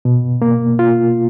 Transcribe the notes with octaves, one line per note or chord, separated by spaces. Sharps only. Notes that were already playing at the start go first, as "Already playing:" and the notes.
B2
A#3
F4